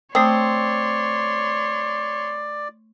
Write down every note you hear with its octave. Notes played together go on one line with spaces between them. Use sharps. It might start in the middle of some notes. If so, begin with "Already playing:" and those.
A3 C4 C#5 D5 C6 D#6